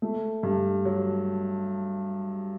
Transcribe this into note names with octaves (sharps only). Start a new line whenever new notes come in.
A3
G2
F#3